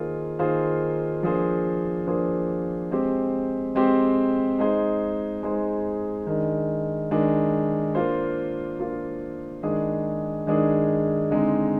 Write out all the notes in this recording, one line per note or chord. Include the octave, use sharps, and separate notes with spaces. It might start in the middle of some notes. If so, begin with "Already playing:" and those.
Already playing: D#3 A#3 F4 G#4 C5
D#3 A#3 F4 G#4 C5
F3 A#3 D4 G#4 C5
F3 A#3 D4 G#4 C5
G#3 C4 G4 C5
G#3 C4 G4 C5
G#3 D#4 G#4 C5
G#3 D#4 G#4 C5
D#3 G#3 D4
D#3 G#3 D4
A#3 D4 F4 C5
A#3 D4 F4 C5
D#3 G#3 D4 G#4
D#3 G#3 D4 G#4
D3 G#3 C4 D#4